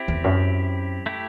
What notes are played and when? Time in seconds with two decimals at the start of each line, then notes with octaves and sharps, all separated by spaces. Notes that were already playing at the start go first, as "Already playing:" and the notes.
Already playing: C4 E4 G4
0.08 E2
0.24 F#2
1.06 A3 E4 G4